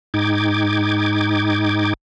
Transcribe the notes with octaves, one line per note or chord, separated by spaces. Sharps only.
G#2 D#4 G5 D6 G#6